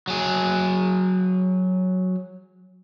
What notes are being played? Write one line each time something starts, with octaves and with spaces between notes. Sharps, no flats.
F#3 G#4